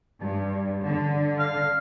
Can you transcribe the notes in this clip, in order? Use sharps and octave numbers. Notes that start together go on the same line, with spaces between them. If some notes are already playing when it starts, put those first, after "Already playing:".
G2
D3
F5